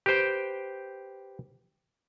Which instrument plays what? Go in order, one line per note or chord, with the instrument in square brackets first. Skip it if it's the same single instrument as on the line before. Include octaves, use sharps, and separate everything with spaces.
[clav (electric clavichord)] G4 B4 C5 G5